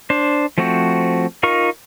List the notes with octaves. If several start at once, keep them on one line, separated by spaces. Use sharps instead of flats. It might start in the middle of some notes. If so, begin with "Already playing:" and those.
D4 C5
F3 A3 C4 F#4
D#4 F4 A#4 C#6